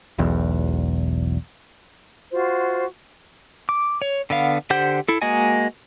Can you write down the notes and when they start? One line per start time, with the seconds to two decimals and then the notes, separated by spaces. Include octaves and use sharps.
0.18 E1 B1 E2
2.31 F4 F#4 C5
3.69 D6
4.02 C#5
4.30 D3 B3 F5
4.70 D3 G4 C5 F#5 G6
5.08 E4 A4
5.22 G#3 A#3 F#4 D#5 G#5